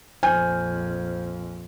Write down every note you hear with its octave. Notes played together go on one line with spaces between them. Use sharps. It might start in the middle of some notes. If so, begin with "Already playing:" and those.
A#1 F2 C5 G#5 F6 G6